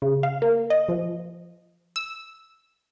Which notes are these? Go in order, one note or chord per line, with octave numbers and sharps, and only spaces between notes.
C#3
F5
A#3
D#5
F3
E6